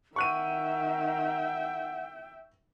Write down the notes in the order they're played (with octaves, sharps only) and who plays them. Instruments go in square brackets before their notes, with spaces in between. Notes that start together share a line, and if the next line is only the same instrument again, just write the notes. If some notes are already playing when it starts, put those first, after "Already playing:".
[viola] D#3 [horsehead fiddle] E5 G5 [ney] F#5 [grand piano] C#6 F#6 D#7